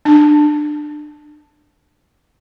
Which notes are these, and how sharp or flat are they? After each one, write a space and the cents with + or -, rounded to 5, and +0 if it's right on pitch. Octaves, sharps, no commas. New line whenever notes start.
D4 +25